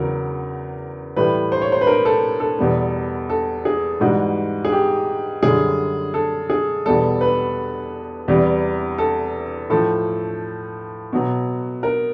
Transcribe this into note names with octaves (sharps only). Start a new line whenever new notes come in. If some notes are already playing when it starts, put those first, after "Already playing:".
Already playing: E2 C#3 F#3 A#4
A2 E3 G3 B4
C5
C#5
C5
B4
A#4
A4
A4
E2 B2 G3
A4
G#4
G#2 E3 G3 F#4
G#4
G4
F#2 D3 G3 G#4
A4
G#4
E2 B2 G3 A4
B4
E2 C3 E3 G3
A4
A2 F3 A4
B2 F#3
A#4